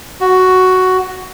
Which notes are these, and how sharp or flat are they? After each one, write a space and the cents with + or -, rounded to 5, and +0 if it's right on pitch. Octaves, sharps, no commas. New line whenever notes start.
F#4 +5